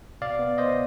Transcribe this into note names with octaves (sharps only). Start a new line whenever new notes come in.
B2 D5 F5
B3
B3 C5 D#5